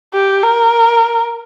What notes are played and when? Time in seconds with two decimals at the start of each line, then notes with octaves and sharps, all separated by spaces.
0.14 G4
0.43 A#4